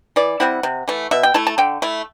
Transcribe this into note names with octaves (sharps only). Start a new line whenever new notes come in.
E3 D5
G3 C4 E4 F#5
C3
E3 A3
B2 E5
G5
A3 E4 A5
A5
D3 G5
A3 E4